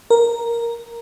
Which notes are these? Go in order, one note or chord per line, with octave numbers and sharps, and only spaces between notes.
A#4